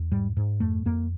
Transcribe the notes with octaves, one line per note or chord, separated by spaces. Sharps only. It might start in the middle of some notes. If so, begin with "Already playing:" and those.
Already playing: E2
G#2 G3
G#2
F2 A3
F2 A#3